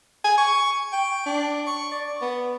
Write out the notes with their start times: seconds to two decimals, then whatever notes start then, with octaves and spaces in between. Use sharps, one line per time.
0.24 G#5
0.38 C#6
0.93 G5
1.26 D4
1.67 C#6
1.92 D5
2.21 B3